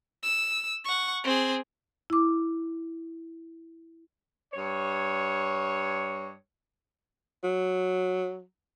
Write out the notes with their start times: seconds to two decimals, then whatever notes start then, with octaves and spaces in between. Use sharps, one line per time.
0.23 E6
0.85 F#5 C#6
1.24 C4 G#4
2.10 E4 D6
4.53 G2 C#5
7.44 F#3